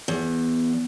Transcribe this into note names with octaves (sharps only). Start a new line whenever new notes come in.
E2